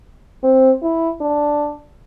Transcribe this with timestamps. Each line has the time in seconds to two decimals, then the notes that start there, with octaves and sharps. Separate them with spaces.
0.44 C4
0.83 E4
1.21 D4